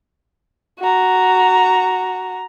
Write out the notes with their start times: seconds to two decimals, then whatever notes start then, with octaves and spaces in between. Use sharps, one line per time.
0.80 F#4 A#5